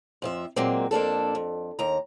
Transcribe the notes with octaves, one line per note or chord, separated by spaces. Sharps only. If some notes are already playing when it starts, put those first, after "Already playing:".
F2 F3 E5
A#2 F#3 G#3 A#3 C4
F2 A#3 D4 A4
F2
D#2 A#5